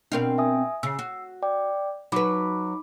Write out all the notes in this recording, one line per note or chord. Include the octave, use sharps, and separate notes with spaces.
B2 C4 D4 A#4 F5
E5 G#5 D#6
C#3 E6 C7
F#4
D5 G5 D6
F#3 D#4 B4 B5 D6